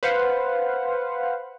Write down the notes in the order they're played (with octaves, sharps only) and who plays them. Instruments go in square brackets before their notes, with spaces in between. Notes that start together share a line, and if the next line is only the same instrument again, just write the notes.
[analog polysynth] B4 C5 F5 F#5